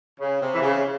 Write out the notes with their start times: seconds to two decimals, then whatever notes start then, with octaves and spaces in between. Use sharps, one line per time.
0.20 C#3
0.41 C3
0.55 E3
0.63 C#3